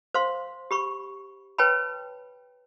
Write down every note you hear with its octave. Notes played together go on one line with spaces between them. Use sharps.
C5 F5 C6
G4 B5 C#6
B4 C#5 G5 A5 B5